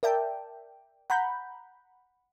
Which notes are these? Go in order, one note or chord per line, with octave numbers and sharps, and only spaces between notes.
A#4 D5 E5 G5 A5
F#5 A#5 B5 G6